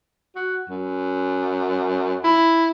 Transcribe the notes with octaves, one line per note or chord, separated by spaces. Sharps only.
F#4
F#2
E4